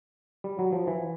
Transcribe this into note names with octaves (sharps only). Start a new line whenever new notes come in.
G3
F#3
F3
E3